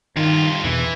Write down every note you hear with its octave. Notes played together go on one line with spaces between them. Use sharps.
G2 D#3 F4
E2 B2 E3